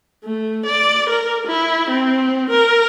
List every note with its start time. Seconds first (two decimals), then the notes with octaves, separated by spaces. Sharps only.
0.24 A3
0.66 D5
1.10 A#4
1.47 E4
1.90 C4
2.50 A#4